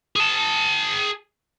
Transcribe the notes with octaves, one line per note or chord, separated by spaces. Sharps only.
G#4 A5